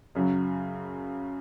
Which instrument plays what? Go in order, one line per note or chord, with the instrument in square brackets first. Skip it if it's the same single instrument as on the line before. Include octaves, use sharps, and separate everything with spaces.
[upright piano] F#2 C#3 F#3